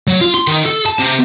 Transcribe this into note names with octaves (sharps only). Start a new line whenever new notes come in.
F#3
F4
C6
D#3
A4
A5
C3